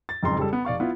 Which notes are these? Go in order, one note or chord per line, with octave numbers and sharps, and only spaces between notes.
A6
F#1 F2 G#2 G#3 A#5 C6
C#3 G3 A4
B3
F1 D5 F5 C#6
B3 E4 F4